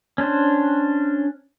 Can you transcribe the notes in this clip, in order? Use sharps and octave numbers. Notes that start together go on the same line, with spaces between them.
C#4 D4 C5